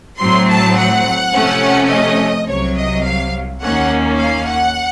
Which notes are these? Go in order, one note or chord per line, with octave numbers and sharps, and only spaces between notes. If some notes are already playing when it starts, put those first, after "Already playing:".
A2 F#3 C4 C6
A5
F#5
C3 F3 A3 C#4
D#5
C2 C3 F#3 C#5
D#5
F5
D#2 D#3 A#3 C#4 F#5
F5
F#5